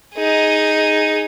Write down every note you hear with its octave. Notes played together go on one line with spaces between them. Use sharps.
D#4 G#4